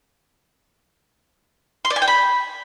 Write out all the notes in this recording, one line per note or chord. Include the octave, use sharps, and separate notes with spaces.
C6
D5
G#5
G5
B5